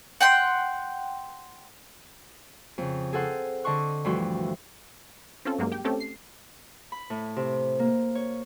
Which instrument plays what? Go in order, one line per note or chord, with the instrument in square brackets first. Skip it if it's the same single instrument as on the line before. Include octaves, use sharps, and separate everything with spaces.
[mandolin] F#5 G5 C6
[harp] F2 C#3
G#4 A4 C5 F#5 C6
D3 D#5 A5 C6 C#6 F#6
D2 G2 E3 F3 F#4 C6
[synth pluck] C4 C#4 F4 A4
G2 F#3 G#3 A#3
G4 G5
A3 C4 C#4 G4 A4
C7
[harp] B5
A2
C3
A#3
C#5